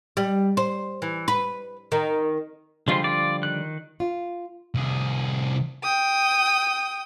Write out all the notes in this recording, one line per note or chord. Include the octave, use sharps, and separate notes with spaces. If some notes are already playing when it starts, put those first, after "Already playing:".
G3
C5
E3
B4
D#3
D3 F3 G3 G#3 F4 C5
F4 D5
D#3 F#6
F4
C2 G#4
G5 D#6